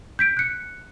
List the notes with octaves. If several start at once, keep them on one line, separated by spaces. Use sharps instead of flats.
G6 B6 D7
F#6 C#7